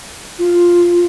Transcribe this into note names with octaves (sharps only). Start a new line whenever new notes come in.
F4